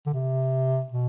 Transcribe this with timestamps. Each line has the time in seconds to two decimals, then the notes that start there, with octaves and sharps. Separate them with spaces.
0.06 D3
0.13 C3
0.92 B2